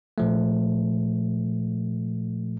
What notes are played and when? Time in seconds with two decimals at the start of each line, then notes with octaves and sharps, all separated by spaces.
0.18 A#2 F3 A3